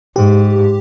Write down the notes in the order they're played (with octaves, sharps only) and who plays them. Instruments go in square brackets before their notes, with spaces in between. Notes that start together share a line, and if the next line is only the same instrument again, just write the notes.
[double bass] G#2 [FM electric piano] G4